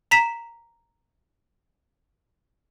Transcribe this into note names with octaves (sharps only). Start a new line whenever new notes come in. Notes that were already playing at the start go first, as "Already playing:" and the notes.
A#5 B6 E7